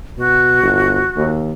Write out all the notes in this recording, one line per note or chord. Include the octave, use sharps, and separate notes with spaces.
B2 F#4
G1
D#2